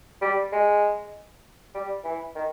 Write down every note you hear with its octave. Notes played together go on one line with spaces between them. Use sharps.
G3
G#3
G3
E3
D#3